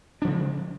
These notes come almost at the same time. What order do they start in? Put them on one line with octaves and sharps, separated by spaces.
D4 F3 C#3 G#3